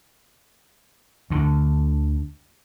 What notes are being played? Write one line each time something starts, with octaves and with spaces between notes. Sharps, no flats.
D2 D3